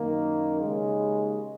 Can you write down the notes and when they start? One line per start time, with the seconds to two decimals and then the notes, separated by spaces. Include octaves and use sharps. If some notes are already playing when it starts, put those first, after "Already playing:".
Already playing: F#2 D#3 A#3
0.61 D#2 C#3 G#3